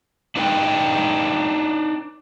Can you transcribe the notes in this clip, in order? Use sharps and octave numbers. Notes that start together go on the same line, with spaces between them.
D4 D#4 B4 F5 G5